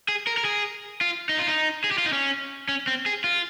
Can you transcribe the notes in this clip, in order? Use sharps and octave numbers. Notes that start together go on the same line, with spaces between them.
G#4
A#4
A#4
G#4
F4
D#4
F4
D#4
G#4
G4
F4
D#4
C#4
C#4
C4
G#4
F4